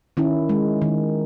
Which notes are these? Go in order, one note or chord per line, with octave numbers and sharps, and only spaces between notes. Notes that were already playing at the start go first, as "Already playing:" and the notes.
D#3 C#4 E4
G#3
D#3